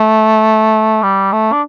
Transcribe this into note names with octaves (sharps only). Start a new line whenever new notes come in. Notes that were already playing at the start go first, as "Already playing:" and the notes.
Already playing: A3
G3
A3
D4